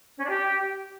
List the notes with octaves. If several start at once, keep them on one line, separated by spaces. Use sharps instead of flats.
C#4
D4
G4